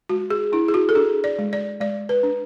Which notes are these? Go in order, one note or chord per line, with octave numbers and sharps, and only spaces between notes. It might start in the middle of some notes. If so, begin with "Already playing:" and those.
G#3 F#4
G#4
D4 E4
G#4
F#4
A4
D4 G#4
D5
G#3
D5
G#3 D5
B4
D4